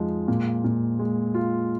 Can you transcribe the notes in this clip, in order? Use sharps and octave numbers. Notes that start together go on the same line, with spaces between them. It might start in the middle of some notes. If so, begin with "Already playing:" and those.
Already playing: F2 F3 G#3 D#4
A#2
A#2
G#3
F4